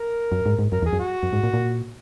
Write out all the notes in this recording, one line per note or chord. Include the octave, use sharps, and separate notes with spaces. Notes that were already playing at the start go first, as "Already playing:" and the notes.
Already playing: A#4
F#2
G#2
G#2
F#2 A#4
E2
G#4
F#2
F#4
F#2
G#2
A#2
A#2